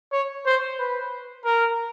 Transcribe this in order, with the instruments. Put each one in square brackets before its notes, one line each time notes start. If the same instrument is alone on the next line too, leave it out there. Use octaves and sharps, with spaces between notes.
[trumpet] C#5
C5
B4
A#4